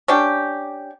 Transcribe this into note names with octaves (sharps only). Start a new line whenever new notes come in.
C#4 D4 G4